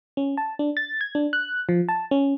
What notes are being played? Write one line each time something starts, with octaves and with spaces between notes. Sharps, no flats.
C#4
A5
D4
A6
G#6
D4
F#6
F3
A5
C#4